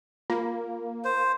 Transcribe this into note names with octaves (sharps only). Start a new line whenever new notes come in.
A#3 F4
C5